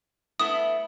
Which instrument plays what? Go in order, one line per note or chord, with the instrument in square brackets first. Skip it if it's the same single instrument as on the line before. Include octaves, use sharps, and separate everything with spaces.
[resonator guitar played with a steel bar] A3 B3 E4 [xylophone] D#6